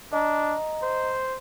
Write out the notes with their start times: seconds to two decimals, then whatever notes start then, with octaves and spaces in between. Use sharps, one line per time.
0.13 D4 D#5 A#5
0.82 C5